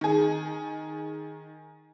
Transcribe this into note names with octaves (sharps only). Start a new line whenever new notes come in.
D#3 G#4